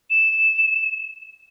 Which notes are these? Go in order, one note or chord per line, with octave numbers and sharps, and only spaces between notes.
E7